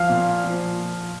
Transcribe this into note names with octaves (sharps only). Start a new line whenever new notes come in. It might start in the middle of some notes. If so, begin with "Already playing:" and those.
Already playing: F3 F5 F6
A#2
F3